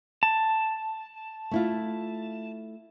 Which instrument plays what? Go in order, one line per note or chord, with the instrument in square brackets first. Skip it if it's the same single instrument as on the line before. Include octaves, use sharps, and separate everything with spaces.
[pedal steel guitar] A5
[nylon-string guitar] A3 E4 F4